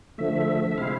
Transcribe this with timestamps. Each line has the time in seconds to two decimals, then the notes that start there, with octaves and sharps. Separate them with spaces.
0.18 D3 F3 A3 E5
0.71 E5
0.77 C3 G#3 C4 E4 F5